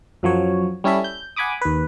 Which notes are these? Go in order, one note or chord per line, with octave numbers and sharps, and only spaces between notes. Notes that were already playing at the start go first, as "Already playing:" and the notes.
F#2 F3 F#3 C#5
G3 C#4 E4 A4 E5
G6
F#5 G#5 B5 D6 D#6
D#2 B4